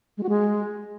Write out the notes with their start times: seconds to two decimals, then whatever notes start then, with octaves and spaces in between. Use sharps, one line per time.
0.17 G#3
0.23 F#4
0.29 G#3